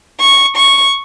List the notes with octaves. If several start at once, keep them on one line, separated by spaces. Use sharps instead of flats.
C#6
C#6